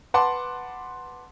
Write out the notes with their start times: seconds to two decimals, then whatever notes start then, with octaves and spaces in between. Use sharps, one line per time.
0.14 B4 F#5 A5 C6 D6